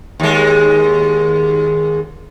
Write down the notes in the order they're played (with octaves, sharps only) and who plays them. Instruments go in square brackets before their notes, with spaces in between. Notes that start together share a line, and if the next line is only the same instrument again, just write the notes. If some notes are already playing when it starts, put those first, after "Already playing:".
[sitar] D#2 G#3